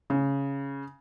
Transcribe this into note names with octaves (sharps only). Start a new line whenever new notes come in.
C#3